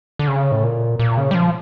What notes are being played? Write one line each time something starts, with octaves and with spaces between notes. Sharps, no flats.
D3
C#3
A2
A#2
A#2
C#3
G3
F3